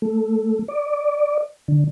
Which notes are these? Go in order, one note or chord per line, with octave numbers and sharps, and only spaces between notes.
A3
D5
D3